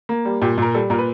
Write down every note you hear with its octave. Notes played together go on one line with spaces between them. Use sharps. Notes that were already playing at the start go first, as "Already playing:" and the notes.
A#3
G3
A#2 G4
A#2 A#4
G3 A4
A#2 A#4
B4